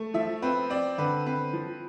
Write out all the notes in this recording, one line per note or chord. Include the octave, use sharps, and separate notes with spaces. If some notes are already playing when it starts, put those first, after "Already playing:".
Already playing: A3
F3 E5
C4 B4
C4 D5
D3 B4
C4 B4
F3